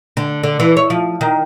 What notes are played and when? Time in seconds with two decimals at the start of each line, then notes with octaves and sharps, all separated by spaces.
0.17 D3
0.43 D3
0.60 E3
0.77 C#5
0.90 F3
1.21 D#3